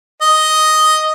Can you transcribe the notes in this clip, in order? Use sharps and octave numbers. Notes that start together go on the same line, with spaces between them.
D#5